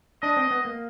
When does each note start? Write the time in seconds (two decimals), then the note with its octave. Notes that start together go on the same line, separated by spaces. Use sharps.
0.22 D4 D#5
0.37 C4
0.51 B3
0.65 A#3